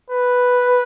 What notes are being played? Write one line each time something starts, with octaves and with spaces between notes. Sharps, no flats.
B4